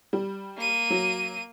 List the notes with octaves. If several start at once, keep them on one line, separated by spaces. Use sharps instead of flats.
G3
A#3 D#7
F#3